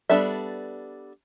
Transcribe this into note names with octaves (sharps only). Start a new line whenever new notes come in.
G3 B3 D4 A4 E5